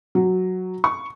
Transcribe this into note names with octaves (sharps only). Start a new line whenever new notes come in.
F#3
C#6